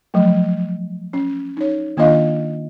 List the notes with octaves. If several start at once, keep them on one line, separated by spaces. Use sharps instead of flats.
F3 F#3 A3
C#4
D#4 C#5
D#3 A#3 D4 F4 D#5 F5